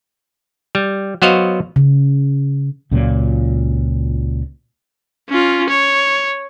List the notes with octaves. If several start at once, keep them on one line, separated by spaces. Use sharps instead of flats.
G3
F#3 B3 F#4 C5 D#5 F5
C#3
C#2 A#2 F#3
C#4 F4
C#5